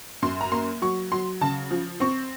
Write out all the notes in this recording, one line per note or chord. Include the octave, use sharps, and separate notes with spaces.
F#2 C6
A#5
A#3 C6
F#3 C#6
F#3 C6
C#3 A5
F3
C4 C#6